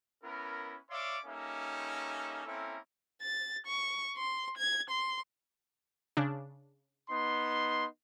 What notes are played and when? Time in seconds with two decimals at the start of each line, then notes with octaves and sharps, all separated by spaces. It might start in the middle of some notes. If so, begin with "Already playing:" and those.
0.23 B3 C#4 E4 A#4
0.90 C#5 D5 E5 F5 C6 D6
1.25 G3 A#3 C#4 D#4 A4 E5
2.45 A#3 C4 C#4 E4 A4 A#4
3.22 A6
3.67 C#6
4.17 C6
4.58 G#6
4.90 C6
6.17 C#3 D4
7.10 B3 D#4 C6